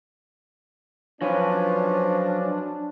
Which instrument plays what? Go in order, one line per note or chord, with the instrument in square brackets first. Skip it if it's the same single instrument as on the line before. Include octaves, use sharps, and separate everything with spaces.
[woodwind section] F3 [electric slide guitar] F#3 B4 [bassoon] C#4 [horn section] D4